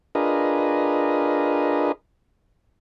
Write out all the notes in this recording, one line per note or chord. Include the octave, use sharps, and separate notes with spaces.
D4 F4 G#4 A#4 B4 D#5